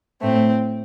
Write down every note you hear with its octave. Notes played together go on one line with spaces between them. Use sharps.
A2 A3 C4